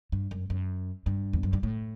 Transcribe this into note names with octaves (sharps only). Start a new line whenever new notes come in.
G2
F#2
F#2
G2
E2
F#2
G2
A2